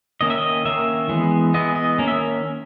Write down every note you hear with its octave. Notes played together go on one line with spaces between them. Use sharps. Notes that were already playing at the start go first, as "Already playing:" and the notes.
D#3 A#3 C#4 D#5
E5
D#5
D#3 A#3 C#4 E5
E3 G#3 B3
E3 G#3 B3 D#5
D#5
D#3 A#3 C#4
E5